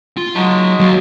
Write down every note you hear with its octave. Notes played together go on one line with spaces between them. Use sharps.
F4
F#3 G#3 D#4 F#4 A5
D#2 F#3